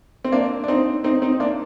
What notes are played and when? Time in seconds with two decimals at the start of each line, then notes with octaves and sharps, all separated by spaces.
0.24 C4
0.32 A#3 D4
0.64 D4
0.68 C4 D#4
1.04 C4 D#4
1.22 C4 D#4
1.40 A#3 D4